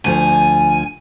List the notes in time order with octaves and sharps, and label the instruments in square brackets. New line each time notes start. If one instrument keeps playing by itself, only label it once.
[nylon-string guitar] D2 F3 [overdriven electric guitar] G#5